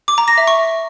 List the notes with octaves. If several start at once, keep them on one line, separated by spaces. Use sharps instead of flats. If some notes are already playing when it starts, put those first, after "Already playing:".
D6
A#5
A#6
E5
C#6